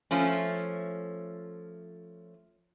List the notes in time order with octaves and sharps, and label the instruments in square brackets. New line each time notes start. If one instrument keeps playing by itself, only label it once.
[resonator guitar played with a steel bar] F3 A3 C#4